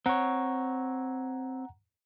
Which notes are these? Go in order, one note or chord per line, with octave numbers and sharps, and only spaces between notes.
C4 C#5 F#5 A#5